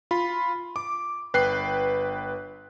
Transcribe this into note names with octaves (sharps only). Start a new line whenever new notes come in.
F4 B5
D6
G1 B4 G5 F#6 C7